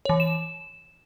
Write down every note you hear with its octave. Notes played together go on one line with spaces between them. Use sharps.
E3 C#5
E7